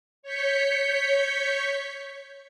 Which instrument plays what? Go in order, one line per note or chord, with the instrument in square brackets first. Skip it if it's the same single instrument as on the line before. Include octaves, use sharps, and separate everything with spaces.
[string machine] C#5 C#6 G6 B6 C#7